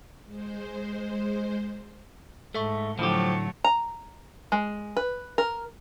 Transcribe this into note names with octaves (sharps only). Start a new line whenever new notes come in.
G#3 C5
G#2 A3 A4 E5 C#6
A2 D3 F3 F#3 A3 G4
A#5
G#3
B4
A#4